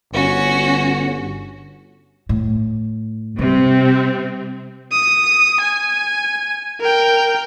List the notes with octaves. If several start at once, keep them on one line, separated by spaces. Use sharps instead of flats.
G1 C#4 F#4
A2
C3 G3 C4
D#6
G#5
A#4 G5